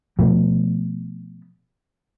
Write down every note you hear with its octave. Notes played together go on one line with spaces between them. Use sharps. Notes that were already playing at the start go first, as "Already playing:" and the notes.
B2 F3 A3 B3